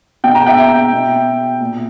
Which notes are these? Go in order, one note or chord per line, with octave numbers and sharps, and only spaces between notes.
B2 G5
A#5
E5 G5
B2
A#2